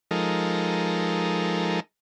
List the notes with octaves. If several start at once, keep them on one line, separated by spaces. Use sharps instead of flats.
F3 G#3 D#4 A4 A#4